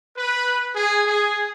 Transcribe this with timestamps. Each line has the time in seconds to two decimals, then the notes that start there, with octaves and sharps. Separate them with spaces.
0.16 B4
0.74 G#4
1.06 G#4